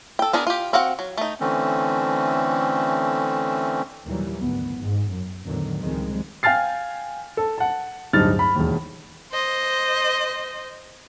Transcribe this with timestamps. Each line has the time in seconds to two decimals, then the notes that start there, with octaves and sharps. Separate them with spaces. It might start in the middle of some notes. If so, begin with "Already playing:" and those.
0.19 A4 G5
0.33 B3 D4 G#4 A#4
0.47 F4 G4
0.73 C4 F#4 F5 F#5
0.99 F#3
1.18 A3 D#4
1.40 D3 E3 A3 C4 C#4
4.05 D#2 A#2 D#3 E3 F#3 G3
4.40 G#1 D2 B3
4.78 G#2
5.10 F#2
5.45 E2 A2 D3 D#3 F#3
5.80 C#2 D#3 F3 G3 G#3 C4
6.43 F5 G5 G#5 F6 A6 C7
7.37 A4
7.58 F#5 A5
8.13 D1 G2 D#4 F6 A6
8.39 B5
8.56 E1 D#2
9.32 C5 D#5